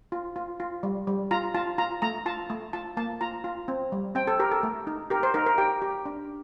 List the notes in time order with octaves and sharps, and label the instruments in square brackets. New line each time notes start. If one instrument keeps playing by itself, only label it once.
[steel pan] F4
F4
F4
G3
G3
F4 A#5
F4 A5
F4 A#5
A3 A#5
F4 A5
A3
F4 A5
A#3 A5
F4 A#5
F4
C4
G3
C4 G5
A4
G4 A#4
A4
A3
D#4
G4 A#4
C5
D#4 A#4
A#4
G4 G5
G4
D4